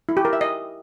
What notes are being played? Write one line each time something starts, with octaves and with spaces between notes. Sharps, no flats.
E4
G4
A#4
E5
D#5